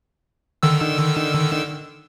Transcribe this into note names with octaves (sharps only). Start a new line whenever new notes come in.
D3 D#3 E6